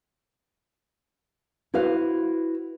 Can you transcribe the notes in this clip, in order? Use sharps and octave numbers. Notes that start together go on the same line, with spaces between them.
E4 F#4 B4 C5 F5